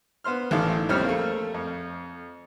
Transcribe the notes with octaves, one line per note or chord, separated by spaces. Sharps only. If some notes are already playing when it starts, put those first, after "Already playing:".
B3 C5 C6 F6
A1 D#3 E4 A4 F5
A#1 F2 G3 C4 C#4 F6
A3 A#3
F2